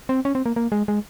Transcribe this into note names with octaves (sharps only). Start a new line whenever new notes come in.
C4
C#4
C4
A#3
A#3
G#3
G#3